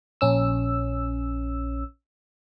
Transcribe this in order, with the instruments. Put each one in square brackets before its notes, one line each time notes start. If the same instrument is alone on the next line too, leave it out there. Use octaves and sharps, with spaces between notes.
[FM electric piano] A#1 C#4 E6